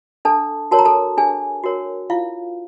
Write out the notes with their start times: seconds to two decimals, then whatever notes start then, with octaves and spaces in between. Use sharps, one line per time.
0.25 D4 A4 A5
0.71 F#4 A#4 C#5 A5
0.79 A#5
0.85 A4 A5
1.17 D4 G#4 G#5
1.64 F#4 A#4 C#5
2.10 E4 F4 F5